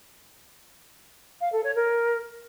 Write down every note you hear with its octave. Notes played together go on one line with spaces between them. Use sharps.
F5
A4
C#5
A#4